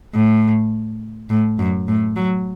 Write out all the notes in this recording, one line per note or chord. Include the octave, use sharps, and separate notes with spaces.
A2
A2
F#2
A2
F#3